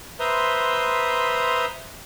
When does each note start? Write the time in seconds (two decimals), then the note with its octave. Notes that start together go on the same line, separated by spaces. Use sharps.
0.20 B4 C5 E5 A#5 C6 D#6